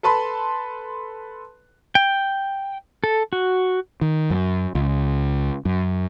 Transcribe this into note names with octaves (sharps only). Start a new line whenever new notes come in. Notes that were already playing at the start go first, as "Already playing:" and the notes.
A4 B4 A5 B5 C6
G5
A4
F#4
D#3
F#2
C#2
F#2